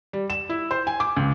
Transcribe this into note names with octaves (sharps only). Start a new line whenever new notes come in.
G3
E7
E4
C5
G#5
D6
C#2